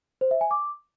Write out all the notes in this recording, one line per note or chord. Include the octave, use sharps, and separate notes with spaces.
C5
E5
G#5
D6